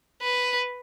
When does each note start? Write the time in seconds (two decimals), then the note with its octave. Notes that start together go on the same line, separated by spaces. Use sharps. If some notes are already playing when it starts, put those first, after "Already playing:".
0.22 B4